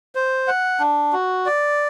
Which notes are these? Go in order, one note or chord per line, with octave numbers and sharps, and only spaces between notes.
C5
F#5
D4
F#4
D5